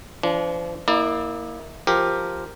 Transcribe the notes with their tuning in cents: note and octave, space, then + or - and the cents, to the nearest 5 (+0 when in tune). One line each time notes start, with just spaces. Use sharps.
F3 -40 D4 -25
A#3 +0 E4 -25 D5 +35
F3 +0 G4 +5 A#4 -5